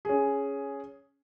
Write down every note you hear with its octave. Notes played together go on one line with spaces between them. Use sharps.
C#4 G#4